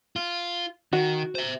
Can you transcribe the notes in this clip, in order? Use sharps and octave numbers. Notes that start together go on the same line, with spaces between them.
F4
D#3 F#4
C5 E5